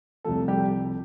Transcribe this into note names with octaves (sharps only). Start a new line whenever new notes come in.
C2 C3 F3 A3 A4
G3 G4